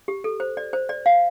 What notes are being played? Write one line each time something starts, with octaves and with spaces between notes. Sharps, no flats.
G4
A4
C5
D5
C5
D5
F5